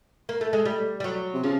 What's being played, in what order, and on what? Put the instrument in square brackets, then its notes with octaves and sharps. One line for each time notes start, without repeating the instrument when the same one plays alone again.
[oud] A#3
A3
G#3
G3
G3
F#3
[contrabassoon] C3
[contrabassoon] C#3 [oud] F3